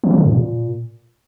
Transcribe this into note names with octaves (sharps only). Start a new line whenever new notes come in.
E3
F3
D3
F#2
A#2